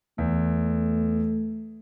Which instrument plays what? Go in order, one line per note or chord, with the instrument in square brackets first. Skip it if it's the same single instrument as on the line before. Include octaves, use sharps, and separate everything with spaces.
[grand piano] E2 [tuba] A3